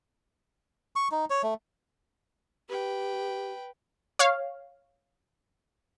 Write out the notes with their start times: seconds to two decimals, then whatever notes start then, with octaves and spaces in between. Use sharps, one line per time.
0.96 C#6
1.12 D#4
1.30 C#5
1.43 A3
2.69 G4 B4 G5
4.19 C#5 F5